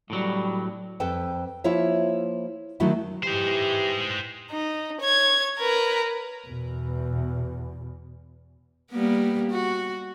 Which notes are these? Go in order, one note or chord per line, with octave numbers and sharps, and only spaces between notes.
A2 F#3 G3
F2 A4 B4 G5 A5
F3 A#3 E4 F4 C#5 E5
D3 D#3 F#3 A3 E4 F#4
E3 D#4 G4 C5
D#4
C#5 G#6
A#4 B4
E2 B2
G3 A#3 B3
F#4